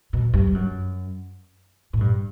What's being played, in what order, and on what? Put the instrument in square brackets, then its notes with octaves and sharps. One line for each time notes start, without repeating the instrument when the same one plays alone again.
[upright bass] B2
G2
G2
F#2
A2
G2